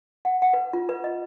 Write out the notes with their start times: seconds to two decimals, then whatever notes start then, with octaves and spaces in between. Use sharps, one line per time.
0.25 F#5
0.42 F#5
0.53 B4
0.73 F4
0.89 B4
1.04 D#5